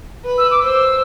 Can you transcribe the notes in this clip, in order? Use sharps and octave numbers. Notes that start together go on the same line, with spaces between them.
B4
E6
D6
C5 E6